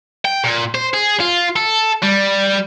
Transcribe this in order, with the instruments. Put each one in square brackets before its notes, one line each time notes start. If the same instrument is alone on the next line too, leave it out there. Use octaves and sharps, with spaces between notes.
[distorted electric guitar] G5
A#2
C5
G#4
F4
A4
G3